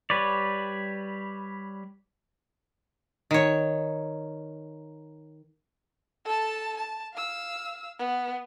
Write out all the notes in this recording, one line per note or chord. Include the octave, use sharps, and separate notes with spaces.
G3 B4 C#5 D5
D#3 C#5
A4 A5
A5
F5 E6
B3